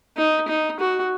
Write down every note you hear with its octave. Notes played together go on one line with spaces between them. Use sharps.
D#4
D#4
F#4